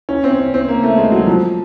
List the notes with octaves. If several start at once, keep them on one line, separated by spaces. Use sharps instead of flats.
C#4
C4
C#4
C4
A#3
A3
G#3
F#3
F3